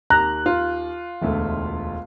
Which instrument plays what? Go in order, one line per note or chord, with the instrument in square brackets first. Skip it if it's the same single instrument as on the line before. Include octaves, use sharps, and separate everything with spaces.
[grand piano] D#2 [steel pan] A#5 [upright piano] F#6
[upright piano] F4
[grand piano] E1 D2 A3